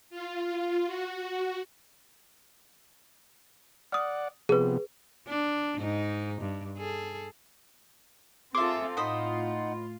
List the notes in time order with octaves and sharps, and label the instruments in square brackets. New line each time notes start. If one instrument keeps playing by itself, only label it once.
[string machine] F4
F#4
[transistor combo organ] D5 F#5 [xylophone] D#6 F6
[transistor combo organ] C3 F3 B3 [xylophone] G#4 B4
[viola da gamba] D4
G#2 D#4
G2
G#4 A4
[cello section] C4 F4 A4 [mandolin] G#4 E5 [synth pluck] C6 D6
[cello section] A2 F4 [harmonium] D#4 F#5 [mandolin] C5 D#5 B5